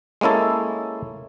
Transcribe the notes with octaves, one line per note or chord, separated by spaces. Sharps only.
G#3 A#3 C#4 E4 A4